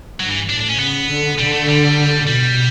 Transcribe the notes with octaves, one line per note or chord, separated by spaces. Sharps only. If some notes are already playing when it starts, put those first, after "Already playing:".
G2 F#3
E3
A2 D4
D4
C#4
C#3 B3
D3
D3 G3
A3
G3
B2 G3